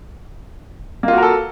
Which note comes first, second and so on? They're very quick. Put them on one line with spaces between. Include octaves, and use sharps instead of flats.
A#3 F4 F#4 A#4 A4